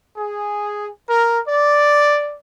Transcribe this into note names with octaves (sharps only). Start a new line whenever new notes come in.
G#4
A#4
D5